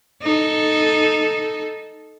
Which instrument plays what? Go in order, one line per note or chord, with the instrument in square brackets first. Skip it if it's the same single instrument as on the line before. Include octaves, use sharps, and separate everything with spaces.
[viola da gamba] D#4 A4